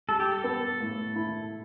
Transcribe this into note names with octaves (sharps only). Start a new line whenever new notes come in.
G3 A4
G4
A4
B3
A2
E4